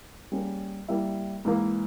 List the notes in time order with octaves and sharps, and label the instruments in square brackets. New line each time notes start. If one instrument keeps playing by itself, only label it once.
[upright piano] G3 A#3 C#4 G#4
G3 A#3 E4
G#2 E3 A#3